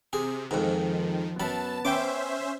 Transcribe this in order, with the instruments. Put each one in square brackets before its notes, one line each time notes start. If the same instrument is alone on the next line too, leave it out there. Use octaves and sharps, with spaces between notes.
[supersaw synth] C3 [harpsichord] G#4
[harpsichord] F2 G#2 [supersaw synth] D#3 [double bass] F3
[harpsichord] F#2 B5 [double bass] B3 [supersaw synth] A5
[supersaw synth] C#4 C5 E5 [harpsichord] G5 D6